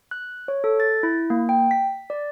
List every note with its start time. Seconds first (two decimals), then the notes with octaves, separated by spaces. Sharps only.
0.11 F#6
0.48 C#5
0.64 A4
0.80 A6
1.03 E4
1.30 A#3
1.49 G5
1.71 B6
2.10 D5